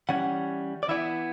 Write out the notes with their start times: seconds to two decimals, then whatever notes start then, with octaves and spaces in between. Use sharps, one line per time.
0.09 E3 G3 C#4 F#5
0.83 D5
0.89 E3 B3 E4 E5